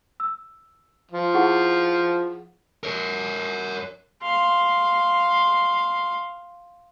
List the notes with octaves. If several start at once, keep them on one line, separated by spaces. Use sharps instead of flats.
E6
F3
E4 G#4 F#5
A#4 C#5
F5 C6